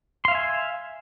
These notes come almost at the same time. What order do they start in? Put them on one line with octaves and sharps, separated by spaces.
C6 F5 E5 G#5